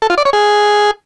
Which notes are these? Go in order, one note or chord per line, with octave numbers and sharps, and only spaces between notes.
A4
F4
D5
C#5
G#4